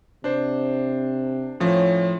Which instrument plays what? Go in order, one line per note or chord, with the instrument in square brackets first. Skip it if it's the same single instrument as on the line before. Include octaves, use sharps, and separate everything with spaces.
[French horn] C3 [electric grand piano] D4 C5
[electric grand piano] A2 F3 [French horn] C#4